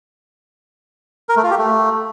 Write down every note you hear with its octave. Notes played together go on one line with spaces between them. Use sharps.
A#4
A3
F4
G4
A3